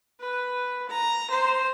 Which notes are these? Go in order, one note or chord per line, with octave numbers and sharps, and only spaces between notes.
B4
A#5
C5